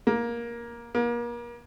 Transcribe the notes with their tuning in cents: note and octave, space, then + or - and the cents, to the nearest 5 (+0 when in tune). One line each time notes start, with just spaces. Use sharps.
A#3 +15
A#3 +35